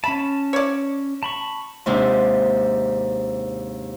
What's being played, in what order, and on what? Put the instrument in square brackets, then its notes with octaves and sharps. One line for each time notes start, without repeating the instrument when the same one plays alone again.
[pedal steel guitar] C#4 A5 [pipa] B5
[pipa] C#5 D5
[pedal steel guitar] A5 B5 C#6
[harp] D#2 G#2 C3 D4